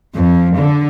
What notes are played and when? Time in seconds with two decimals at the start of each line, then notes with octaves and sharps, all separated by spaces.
0.14 F2
0.56 D3